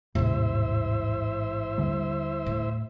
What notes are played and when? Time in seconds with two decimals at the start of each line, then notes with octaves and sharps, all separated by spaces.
0.15 A1 D#2 G#2 C3 G3 E4 C5 E5
1.78 D#2 D3 G3
2.46 A2